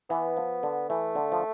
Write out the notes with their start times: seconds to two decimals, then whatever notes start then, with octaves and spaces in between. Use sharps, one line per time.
0.10 E3 B3
0.37 F3
0.63 D3
0.89 E3 A3
1.15 D3
1.32 F3